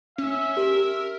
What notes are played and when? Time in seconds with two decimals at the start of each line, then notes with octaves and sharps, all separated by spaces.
0.18 C#4 E5
0.57 G4 A#4